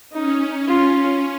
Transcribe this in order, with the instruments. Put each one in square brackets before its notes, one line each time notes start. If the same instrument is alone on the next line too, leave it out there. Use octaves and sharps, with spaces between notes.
[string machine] C#4 [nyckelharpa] D#4
[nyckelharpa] F4